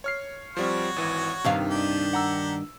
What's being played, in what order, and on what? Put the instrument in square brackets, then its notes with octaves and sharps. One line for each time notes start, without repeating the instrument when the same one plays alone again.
[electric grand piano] C#5 F6 C7
[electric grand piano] F3 G3 C4 [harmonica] F#4 C#5
[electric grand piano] G#1 E3
[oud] G2 D#3 F5 [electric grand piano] C3
[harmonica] D4 G4
[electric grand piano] F#5 A#5 E6